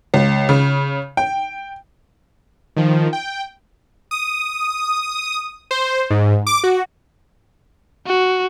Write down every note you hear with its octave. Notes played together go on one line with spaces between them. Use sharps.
C#2
C#3
G5
D#3 F3
G5
D#6
C5
G#2
D6
F#4
F#4